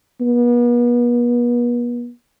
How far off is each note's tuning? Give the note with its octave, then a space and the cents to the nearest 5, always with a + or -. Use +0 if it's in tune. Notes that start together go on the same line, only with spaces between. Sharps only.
B3 -40